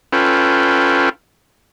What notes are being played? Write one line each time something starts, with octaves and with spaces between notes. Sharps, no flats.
C#4 F4 A4 B4 G5